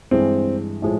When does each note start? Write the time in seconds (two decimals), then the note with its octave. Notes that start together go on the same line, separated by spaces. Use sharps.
0.11 G2 E3 G#3 C4
0.82 A2 F3 G#3